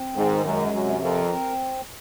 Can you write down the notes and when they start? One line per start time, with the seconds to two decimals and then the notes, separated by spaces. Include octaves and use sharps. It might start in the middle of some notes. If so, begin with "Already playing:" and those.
Already playing: C4
0.16 G#2 D#3
0.45 F#2 G#3
0.72 F#2 C3
1.01 F2 A#4
1.30 C4